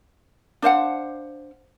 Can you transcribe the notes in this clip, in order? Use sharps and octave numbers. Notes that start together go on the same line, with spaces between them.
D4 C5 F5 F#5